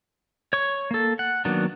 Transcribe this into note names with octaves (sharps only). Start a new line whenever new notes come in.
C#5 C#6
A#3 A4
F#5
D#3 F#3 A#3 B3 D4